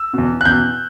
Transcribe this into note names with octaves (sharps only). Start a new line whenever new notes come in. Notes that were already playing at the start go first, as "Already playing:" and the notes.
Already playing: E6
E2 B2
F#6
E2 B2 G6